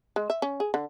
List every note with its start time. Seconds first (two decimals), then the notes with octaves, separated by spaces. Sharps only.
0.16 G#3
0.30 E5
0.42 C#4
0.60 G#4
0.74 D3